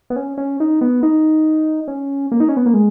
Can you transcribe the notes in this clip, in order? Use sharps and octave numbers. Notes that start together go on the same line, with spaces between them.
B3
C#4
C#4
D#4
B3
D#4
C#4
A#3
D#4
C#4
B3
A#3
G#3